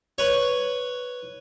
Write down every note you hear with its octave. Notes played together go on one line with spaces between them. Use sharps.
B4 C#5